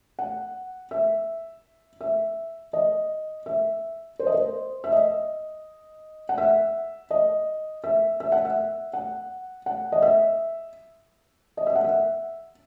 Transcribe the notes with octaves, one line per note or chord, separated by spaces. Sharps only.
F#5
E5
E5
D#5
E5
C5
D#5
C5
E5
D#5
F#5
E5
D#5
E5
E5
F#5
E5
F#5
F#5
D#5
E5
D#5
E5
F#5
E5